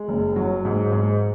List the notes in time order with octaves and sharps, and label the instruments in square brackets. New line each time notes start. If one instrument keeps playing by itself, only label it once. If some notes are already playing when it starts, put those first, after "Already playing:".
Already playing: [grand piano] G#3
F#1
F#3
G#2
G#2